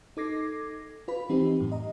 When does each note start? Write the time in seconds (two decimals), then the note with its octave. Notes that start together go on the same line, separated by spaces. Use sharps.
0.17 D#4 A4 D6 G#6 A#6 C7
1.08 F4 B4 B5
1.29 E3 C4 D#4 G4
1.60 F#2 A2
1.72 D#5 A#5